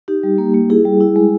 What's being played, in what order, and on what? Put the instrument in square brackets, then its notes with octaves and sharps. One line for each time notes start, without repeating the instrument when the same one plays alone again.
[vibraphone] D#4 G4
G3
A#3
A#3
E4 G#4
G3
E4
G#3